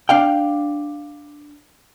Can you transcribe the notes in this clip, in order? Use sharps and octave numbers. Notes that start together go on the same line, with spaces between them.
D4 F5 G5